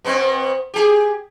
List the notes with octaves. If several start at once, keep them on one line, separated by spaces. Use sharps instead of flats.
B2 B3 C4
G4 G#4